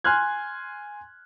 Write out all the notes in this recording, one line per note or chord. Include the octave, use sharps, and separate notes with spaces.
G#5 C6 F6 F#6 G#6